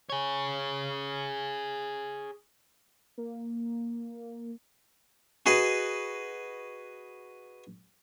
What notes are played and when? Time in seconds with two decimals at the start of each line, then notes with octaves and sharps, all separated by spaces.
0.10 G#4 C#5
3.18 A#3
5.46 F#4 G#4 B4 D#5